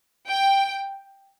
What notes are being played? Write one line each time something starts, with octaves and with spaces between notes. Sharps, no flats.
G5